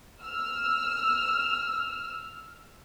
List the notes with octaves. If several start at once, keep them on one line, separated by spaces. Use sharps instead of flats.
E6 F6